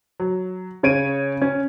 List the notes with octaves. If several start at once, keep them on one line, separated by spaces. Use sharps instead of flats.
F#3
C#3 C#5 D7 D#7
C#4